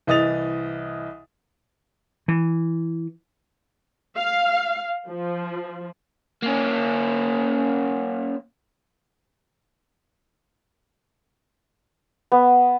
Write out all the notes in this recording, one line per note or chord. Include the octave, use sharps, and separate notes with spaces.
C2 E3 D#5 D#6 A6 F7
E3
F5
F3
A#3 C#4
B3